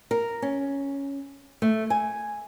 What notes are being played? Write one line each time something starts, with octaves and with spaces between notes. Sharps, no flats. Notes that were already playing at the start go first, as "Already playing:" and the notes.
A#4
C#4
A3
G#5